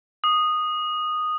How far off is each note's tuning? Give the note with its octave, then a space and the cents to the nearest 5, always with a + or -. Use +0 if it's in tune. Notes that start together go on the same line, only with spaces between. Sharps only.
D#6 -10